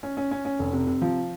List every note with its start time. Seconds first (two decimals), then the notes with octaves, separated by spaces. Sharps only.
0.03 C#4
0.17 C#4
0.31 C#4
0.45 C#4
0.59 F1
0.73 C3
0.87 C3
1.02 F3